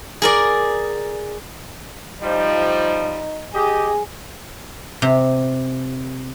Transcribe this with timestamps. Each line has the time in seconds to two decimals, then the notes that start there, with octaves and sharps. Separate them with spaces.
0.22 G#4 A#4 D5
2.23 F3 G3 D#4
3.54 G4 G#4 D#5
5.02 C3